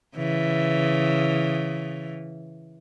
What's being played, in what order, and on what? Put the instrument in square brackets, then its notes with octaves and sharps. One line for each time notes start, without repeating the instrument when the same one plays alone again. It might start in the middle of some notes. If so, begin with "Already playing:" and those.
[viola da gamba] C#3 E3